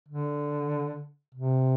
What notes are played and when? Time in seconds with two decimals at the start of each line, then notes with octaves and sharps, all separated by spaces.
0.08 D3
1.35 C3